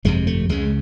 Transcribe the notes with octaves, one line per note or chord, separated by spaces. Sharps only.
G1 F2 C3 G#3
A3
C#2 C#3 G#3